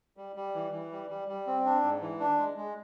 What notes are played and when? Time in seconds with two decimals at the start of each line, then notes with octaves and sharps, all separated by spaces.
0.17 G3
0.36 G3
0.54 E3
0.72 E3
0.91 G3
1.09 G3
1.28 G3
1.47 C4
1.65 D4
1.83 G#2
2.01 E3
2.20 D4
2.38 G#3
2.57 G#3